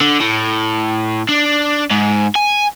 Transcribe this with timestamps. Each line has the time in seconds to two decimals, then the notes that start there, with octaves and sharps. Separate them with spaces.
0.01 D3
0.20 A2
1.29 D4
1.91 G#2
2.36 G#5